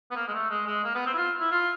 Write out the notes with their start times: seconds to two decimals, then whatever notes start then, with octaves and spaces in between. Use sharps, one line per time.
0.11 B3
0.16 A#3
0.28 G#3
0.33 A3
0.50 G#3
0.67 G#3
0.84 A#3
0.94 B3
1.06 C4
1.13 E4
1.17 F4
1.40 E4
1.52 F4